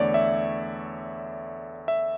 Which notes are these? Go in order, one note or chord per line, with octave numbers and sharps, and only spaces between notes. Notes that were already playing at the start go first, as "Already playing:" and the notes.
Already playing: E2 D3 A3 C#5 D5
E5
E5